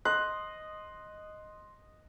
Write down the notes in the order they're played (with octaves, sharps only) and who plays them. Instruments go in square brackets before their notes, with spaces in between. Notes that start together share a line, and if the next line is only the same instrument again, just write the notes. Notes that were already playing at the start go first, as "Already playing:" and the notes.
[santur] D#5 [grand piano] C6 F#6